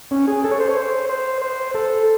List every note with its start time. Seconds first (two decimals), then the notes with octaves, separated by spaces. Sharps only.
0.11 C#4
0.28 G#4
0.44 A4
0.51 C#5
0.60 C5
0.69 C#5
0.77 C5
1.09 C5
1.42 C5
1.75 A4